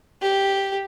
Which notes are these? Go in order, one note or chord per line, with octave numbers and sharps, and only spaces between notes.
G4